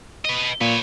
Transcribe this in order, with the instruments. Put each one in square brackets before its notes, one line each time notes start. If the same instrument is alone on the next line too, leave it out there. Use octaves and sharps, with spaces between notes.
[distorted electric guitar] B4 D#5
[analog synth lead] A#2 [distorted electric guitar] B4 C#5